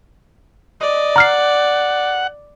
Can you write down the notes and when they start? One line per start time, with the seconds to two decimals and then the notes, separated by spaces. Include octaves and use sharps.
0.81 D5 D#5
1.16 F#5 A#5 F6 C7